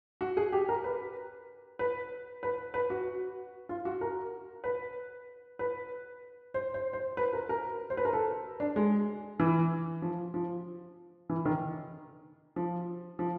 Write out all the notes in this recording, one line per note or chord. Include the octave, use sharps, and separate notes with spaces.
F#4
G#4
G4
A#4
B4
B4
B4
B4
F#4
F4
F#4
A#4
B4
B4
C5
C5
C5
B4
A#4
A#4
C5
B4
A#4
A4
D4
G#3
E3
F3
F3
E3
D#3
F3
F3